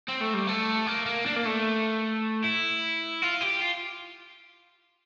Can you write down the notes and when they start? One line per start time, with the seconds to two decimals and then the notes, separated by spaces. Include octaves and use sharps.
0.09 C4
0.21 A3
0.34 G3
0.48 A3
0.87 A#3
1.06 A#3
1.26 D4
1.36 A#3
1.46 A3
2.44 E4
3.22 F4
3.41 G4
3.62 F4